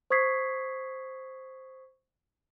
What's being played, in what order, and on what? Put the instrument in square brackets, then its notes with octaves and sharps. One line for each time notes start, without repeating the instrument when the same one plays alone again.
[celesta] C5 C#6 D#6 G#6 B6 C7